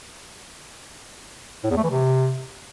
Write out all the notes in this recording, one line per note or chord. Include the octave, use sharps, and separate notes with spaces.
A2
E2
A3
E3
C3